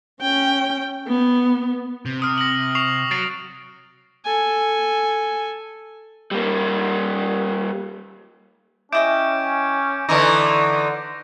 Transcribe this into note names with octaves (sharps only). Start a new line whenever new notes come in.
C#4 G5
B3
C3
D#6 F6
A#6 F#7
C#6 C7 F7
F#3 A6 C7 D7
A4 G#5
G3 A#3
C#4 E4 D#5 G5 D6 G6 D7
D3 E3 D#4 C#6 D6 A#6